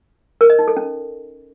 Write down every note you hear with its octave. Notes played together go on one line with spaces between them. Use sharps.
A#4
D#5
D#4
A4
C#4